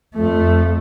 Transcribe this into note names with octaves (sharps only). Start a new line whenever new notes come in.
F2 A3